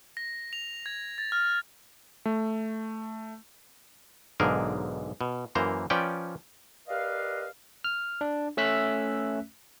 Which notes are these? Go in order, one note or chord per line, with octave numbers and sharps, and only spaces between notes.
A#6
F7
G#6
A6
F6
A3
B1 G#2 D3 G#4 A#4
B2
F#2 E3 A#3 C5 A#5
F3 C#4 B4 D5 G5
G4 A#4 B4 D5 D#5 F5
F6
D4
A3 C#4 E5 E6 F#6 B6